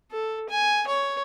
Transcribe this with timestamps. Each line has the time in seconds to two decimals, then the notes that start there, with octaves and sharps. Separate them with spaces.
0.12 A4
0.49 G#5
0.87 C#5